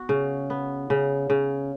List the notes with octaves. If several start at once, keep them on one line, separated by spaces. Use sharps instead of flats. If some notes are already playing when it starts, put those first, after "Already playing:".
Already playing: B3 F#4
C#3
B3
C#3
C#3